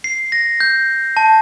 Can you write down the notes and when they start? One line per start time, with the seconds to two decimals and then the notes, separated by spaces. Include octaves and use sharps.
0.04 C7
0.32 A#6
0.60 G6
1.17 A5